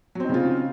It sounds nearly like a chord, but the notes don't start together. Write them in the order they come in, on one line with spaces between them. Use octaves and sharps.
F#3 C4 D#4 C#3 F4